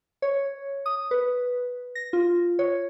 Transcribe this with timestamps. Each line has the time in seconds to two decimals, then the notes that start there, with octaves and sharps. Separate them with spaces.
0.22 C#5
0.86 D#6
1.11 B4
1.95 A#6
2.13 F4
2.59 C#5